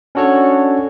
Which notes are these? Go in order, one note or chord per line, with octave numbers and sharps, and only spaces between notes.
C#4 D4 F#4 A4 C#5